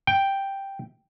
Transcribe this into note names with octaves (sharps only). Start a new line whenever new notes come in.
G5